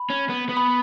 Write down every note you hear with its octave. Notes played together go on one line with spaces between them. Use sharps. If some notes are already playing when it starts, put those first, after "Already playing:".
Already playing: B5
C#4
B3
B3
B5